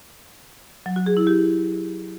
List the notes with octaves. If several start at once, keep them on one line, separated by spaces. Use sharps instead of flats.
F#3
F#4
G#4
E4
G4